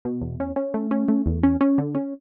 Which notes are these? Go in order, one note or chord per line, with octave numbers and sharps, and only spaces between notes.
B2
E2
C#4
C#4
A3
C#4
A3
E2
C#4
C#4
D3
C#4